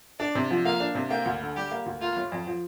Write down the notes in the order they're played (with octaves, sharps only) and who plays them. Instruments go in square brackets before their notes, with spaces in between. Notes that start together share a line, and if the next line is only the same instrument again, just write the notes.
[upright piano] D4 [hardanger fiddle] D5
[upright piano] C3
F3
[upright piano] A#3 [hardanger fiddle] F5
[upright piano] D4
C3
[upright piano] A#3 [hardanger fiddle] G5
[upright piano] D2
D3
[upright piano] G3 [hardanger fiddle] G4
[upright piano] A#3
D2
[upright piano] A#3 [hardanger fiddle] F4
[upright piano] G1
F2
F3